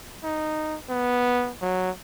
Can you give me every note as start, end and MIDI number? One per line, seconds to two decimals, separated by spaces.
0.23 0.76 63
0.89 1.52 59
1.62 1.91 54